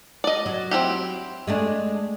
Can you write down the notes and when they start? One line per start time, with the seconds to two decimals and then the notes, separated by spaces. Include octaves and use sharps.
0.24 D5 D#5
0.46 F#3
0.71 C4 E4 G4
1.47 G#3 A3 D4